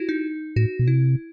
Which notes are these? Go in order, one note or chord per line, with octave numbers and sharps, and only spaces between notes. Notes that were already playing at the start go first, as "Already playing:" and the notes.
Already playing: E4 F#4 G4
D#4
A2 F#4
B2
C3 E4